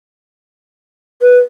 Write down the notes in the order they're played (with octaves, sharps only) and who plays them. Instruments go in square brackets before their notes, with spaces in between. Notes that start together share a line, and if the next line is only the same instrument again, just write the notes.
[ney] B4